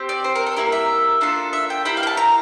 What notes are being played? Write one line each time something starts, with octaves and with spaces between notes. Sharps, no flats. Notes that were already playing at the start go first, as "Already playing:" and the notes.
Already playing: C4 G4
D5
C5
A#4
A4
A#3 E4 G4 A#4
E5
A#3 D4 F4 A4
E5
G5
A#3 E4 G4 G5
F5
G5
A5
A#5